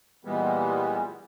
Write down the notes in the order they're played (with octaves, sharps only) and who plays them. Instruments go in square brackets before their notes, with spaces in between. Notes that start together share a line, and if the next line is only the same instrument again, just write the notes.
[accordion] A#2 E3 G3 G#3 B3